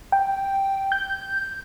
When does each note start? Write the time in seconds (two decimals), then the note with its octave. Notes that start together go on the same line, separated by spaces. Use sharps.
0.12 G5
0.92 G6